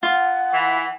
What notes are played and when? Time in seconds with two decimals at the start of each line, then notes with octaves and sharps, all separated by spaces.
0.03 F4 F#5
0.53 E3